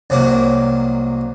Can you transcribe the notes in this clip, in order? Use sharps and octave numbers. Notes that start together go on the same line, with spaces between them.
C2 F#3 A#3